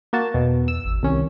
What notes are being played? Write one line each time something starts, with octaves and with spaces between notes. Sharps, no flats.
A#3 F#4 A5
E2 B2
E6
G#1
C2 D#3 C#4